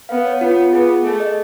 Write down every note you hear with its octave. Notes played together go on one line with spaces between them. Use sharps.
B3 F5
C#5
B3 F4
F4
B3 G#4
G#4
A3 G#4
D#5